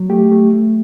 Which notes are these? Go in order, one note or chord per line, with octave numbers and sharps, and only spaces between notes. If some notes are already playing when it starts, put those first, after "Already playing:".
Already playing: F#3
A3 G4
A3
A3